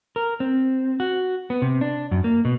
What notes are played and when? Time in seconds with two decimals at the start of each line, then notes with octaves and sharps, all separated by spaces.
0.16 A#4
0.40 C4
1.00 F#4
1.50 B3
1.62 C3
1.81 D4
2.11 F#2
2.24 A#3
2.45 B2